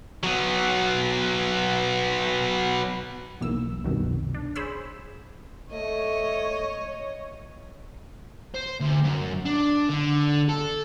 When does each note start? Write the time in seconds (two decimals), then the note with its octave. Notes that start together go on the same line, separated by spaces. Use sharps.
0.23 F#3 B3
3.41 B1 E2 A#3 E6
3.84 C2 F#2 B2 D#3
4.34 D4
4.55 G#4 C5 C#5 B5 E6
5.72 A3 C#5 D#5
8.54 C5
8.80 D2
9.04 F#2
9.45 D4
9.89 D3
10.49 A4